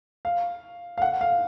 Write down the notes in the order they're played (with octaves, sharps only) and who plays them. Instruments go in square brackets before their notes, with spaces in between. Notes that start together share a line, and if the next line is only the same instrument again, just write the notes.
[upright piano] F5
F5
F#5
F5